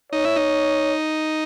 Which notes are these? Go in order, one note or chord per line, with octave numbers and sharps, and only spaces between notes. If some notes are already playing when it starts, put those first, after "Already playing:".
D#4 C#5
E4
D#4